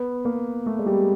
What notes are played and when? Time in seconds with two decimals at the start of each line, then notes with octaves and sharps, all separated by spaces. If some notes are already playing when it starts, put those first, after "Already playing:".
Already playing: B3
0.25 A#3
0.66 A3
0.79 G#3
0.86 G3